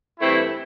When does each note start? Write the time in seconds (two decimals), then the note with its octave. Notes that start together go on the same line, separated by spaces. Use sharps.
0.20 G2 E3 A3 C4 E4